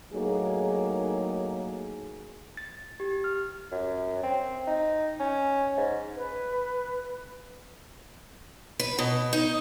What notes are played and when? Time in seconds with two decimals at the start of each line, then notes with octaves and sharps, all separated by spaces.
0.12 A2 F#3 A#3 D#4 G#4
2.57 A6
3.00 G4
3.24 F6
3.72 F#2
4.23 C4
4.67 D#4
5.20 C#4
5.77 G#2
6.16 B4
8.79 B4
8.99 B2
9.33 D#4